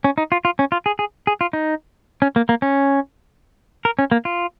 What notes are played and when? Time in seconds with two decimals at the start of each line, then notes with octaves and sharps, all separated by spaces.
0.04 C#4
0.18 D#4
0.32 F4
0.45 F4
0.59 C#4
0.72 F4
0.86 G#4
0.99 G#4
1.27 G#4
1.41 F4
1.53 D#4
2.22 C#4
2.36 A#3
2.49 A#3
2.62 C#4
3.85 A#4
3.99 C#4
4.12 A#3
4.25 F4